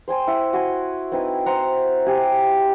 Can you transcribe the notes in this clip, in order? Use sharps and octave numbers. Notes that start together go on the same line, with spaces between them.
C5 G5 G#5 C6
E4 F#5
F#4 G#5 C6
C4 D#4 E4 B4
C5 E5 F#5 A#5
G4 F#5 G#5